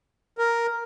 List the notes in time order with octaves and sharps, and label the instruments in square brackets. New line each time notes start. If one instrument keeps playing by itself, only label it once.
[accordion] A#4